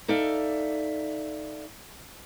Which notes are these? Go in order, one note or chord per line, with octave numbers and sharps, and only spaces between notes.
D#4 A4 D5 E5 F5